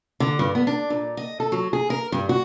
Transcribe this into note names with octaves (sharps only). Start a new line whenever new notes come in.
D3
G2
B3
D4
A#2
D#5
A4
F#3
G#4
A#4
G2
F#4